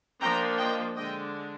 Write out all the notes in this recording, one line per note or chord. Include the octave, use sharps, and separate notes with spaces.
F3 A#3 D4 G5 A#5
D#5 G5
D3 G#3 D4 D#5 G5